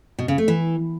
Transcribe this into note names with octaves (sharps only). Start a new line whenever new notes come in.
B2
C#3
A3
E3